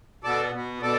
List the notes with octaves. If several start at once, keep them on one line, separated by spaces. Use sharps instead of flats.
B2 B3 A4 D5
B2 B3
B2 A4 D5